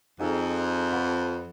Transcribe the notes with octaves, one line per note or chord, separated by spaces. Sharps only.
F2 D#4 G#4 A4
B4 F#5 B5